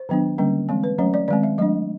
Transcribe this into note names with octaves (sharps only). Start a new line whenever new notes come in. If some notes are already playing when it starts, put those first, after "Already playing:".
Already playing: C5
D#3 F#3 B3 D4
D3 G3 A#3 C#4
E3 G#3 C4
B4
F#3 A3 C#4 C#5
D5
D#3 G#3 C4 D5
E5
F#3 A3 D4 D#5